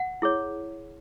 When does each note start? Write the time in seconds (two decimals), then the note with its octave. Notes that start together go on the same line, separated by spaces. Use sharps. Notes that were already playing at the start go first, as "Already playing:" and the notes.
Already playing: F#5
0.22 E4 G#4 C#5